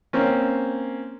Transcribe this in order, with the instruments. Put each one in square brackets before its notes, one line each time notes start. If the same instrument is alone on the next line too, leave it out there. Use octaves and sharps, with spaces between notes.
[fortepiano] A#3 C4 C#4